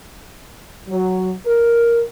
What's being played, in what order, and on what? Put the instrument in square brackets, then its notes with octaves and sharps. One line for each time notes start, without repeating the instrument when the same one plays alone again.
[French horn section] F#3
A#4